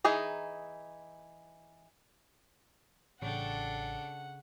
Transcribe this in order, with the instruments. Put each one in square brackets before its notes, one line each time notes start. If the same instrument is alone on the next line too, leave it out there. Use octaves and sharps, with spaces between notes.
[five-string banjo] E3 D#4 G#4 A#5
[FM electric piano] A1 [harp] C#3 G5 [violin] D4 A4 [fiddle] F#5